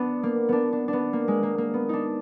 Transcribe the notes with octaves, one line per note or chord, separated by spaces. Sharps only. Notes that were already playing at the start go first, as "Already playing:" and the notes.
Already playing: B3 D4
A#3
B3 D4
D4
D4
B3
A#3
G#3
A#3
A#3
B3
D4 D#4